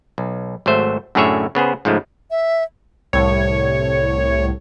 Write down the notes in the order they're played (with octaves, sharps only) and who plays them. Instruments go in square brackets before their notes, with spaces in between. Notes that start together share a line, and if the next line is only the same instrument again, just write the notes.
[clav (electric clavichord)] B1
G#1 F#3 A3 C5 E5
F#2 A2 D3 G#4 C#5 E5
C#3 B3 G#4 C5
G#2 C#3 F3 G#3 A3
[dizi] E5
[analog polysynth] C2 A2 [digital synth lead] C#5